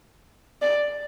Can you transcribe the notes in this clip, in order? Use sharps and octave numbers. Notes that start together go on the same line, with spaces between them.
D5